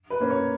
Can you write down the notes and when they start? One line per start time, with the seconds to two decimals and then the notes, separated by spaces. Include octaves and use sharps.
0.10 B4
0.20 A#3 C#4
0.30 C#5